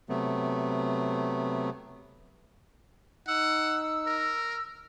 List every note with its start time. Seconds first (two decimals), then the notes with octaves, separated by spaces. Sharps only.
0.09 C3 F#3 A3 B3
3.28 D#4 F#5 E6
4.07 A#4